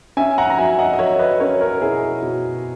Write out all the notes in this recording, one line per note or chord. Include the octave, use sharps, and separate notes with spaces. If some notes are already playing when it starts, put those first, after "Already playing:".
C#4 E5 G#5
F#5 A#5
A#5
F#3 E5 G#5
D#5 F#5
D#5
F#3 C#5 E5
B4 D#5
C#4 A#4 C#5
A#4 C#5
B2 E4 G#4
B2